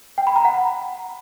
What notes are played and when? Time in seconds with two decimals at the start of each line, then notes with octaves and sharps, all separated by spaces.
0.18 G5
0.27 B5
0.36 A#5
0.45 F#5